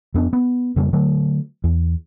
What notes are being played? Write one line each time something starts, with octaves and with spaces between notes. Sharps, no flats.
F2 B3 D4
B3
F2 C#3 G3 A#3
D3 F#3 A3
E2